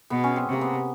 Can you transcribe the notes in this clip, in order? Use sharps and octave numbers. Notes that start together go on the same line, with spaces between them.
B2 B3
C#4
C4
C3 A#3
B3